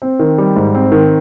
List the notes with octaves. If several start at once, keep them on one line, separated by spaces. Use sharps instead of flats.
C4
D#3
G3
G#2
C4
D#3